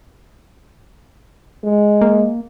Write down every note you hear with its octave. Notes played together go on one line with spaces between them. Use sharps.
G#3
A#3